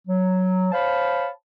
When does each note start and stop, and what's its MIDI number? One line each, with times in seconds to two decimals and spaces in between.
0.07 0.68 54
0.72 1.29 72
0.72 1.29 73
0.72 1.29 77
0.72 1.29 81
0.72 1.29 83